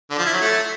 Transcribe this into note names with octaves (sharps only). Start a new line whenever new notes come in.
D3
F3
E4
F#3
A3